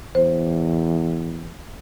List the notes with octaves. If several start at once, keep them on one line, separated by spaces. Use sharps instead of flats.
E2 C5